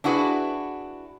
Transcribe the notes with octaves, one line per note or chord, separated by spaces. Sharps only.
D4 E4 F#4 G#4 B4